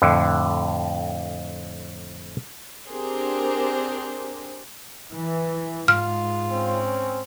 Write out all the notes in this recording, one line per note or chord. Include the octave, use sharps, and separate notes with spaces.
F2 A2 D3
C4 D4 G4 G#4 A#4 C5
E3
G#2 F4 F6
C4 C#4